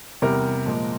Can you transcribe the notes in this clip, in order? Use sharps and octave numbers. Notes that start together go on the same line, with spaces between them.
E2 C3 G3 A#4
A#2 F3 G#3